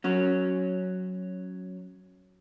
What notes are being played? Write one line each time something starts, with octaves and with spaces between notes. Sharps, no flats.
F#3 C#4